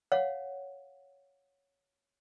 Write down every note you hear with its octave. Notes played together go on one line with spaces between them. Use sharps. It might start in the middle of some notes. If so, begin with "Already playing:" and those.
C#5 F5 F#5